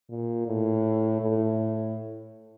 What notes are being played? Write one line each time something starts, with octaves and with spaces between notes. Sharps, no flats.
A#2
A2
A2